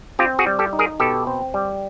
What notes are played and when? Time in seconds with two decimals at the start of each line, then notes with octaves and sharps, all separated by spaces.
0.19 C4 F4 G4
0.39 F#4 G#4
0.46 G3
0.59 G4 A4
0.73 D#4
0.79 G#4 A#4
1.00 B2 G4 A4
1.27 C4
1.54 G3